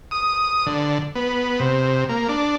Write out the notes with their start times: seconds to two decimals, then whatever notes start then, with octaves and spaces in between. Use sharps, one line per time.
0.11 D#6
0.66 D3
1.15 B3
1.60 C3
2.09 A#3
2.29 D4